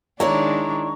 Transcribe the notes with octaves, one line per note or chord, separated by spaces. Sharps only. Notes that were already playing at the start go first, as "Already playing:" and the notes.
D#3 G#3 D4 E4 C#5 D5 A#5 C#6